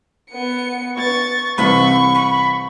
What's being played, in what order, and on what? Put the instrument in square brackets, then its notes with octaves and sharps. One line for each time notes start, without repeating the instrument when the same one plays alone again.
[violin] B3 C#7
[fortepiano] B3 [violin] C#6 A6
[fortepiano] C2 C3 E3 [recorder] B5 [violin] C#6
[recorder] B5